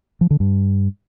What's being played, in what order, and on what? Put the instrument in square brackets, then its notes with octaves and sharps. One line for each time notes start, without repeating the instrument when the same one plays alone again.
[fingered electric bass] F3
D3
G2